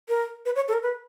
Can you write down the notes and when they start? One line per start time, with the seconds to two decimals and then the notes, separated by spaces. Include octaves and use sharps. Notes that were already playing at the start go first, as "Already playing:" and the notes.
0.09 A#4
0.46 B4
0.56 C#5
0.68 A4
0.73 A#4
0.83 B4